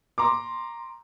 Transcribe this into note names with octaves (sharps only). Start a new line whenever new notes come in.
A#5 C6 D6